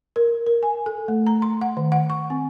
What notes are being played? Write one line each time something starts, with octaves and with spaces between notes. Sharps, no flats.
A#4
A#4
G#5
A4
A3
A#5
C6
F#5
D#3
F#5
C#6
C4